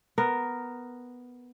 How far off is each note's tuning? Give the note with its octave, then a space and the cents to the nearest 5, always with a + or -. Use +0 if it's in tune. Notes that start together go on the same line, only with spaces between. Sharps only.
B3 +0 A#4 +0